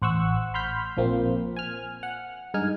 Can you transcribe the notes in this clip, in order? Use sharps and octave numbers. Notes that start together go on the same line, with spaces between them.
A1 C5 F#5 C#6 E6
B5 C6 F6 G6 B6
A#1 F3 A#3 C4
G#5 F6
F#5
G2 G#3 D#4 G#5 F6